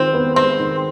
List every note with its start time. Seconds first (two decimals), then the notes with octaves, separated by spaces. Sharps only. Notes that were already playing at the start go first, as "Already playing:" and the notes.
Already playing: D#3 G#3 C4 F4
0.13 B3
0.36 G#3 C4
0.59 D#3